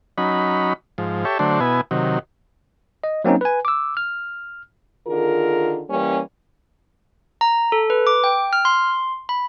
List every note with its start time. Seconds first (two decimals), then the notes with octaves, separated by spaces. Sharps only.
0.18 F#3 C#4 D#4 B5
0.98 G#2 F3
1.25 G4 A4 C#5 E5
1.39 D3 F#3 A3 D4 C5
1.60 B2 B3 E4 G#5
1.91 C3 D#3 F#3
3.04 D#5
3.24 F#3 A#3 C4 C#4 D#4
3.41 B4 G#5
3.65 D6 E6
3.97 F6
5.07 D3 D#3 F4 G#4 A#4
5.89 E3 G3 A#3 C#4
7.41 A#5
7.72 A4
7.90 B4
8.07 D6
8.24 G5
8.53 F6
8.65 C6
9.29 B5